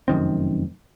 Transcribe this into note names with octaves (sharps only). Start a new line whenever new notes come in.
F1 F#2 D#3 C4